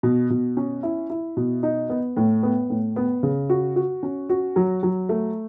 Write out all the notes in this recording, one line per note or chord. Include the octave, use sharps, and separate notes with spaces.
B2
B2
C#4
E4
E4
B2
D#4
B3
A2
B3
A2
B3
C#3
F#4
F#4
C#4
F#4
F#3
F#3
A3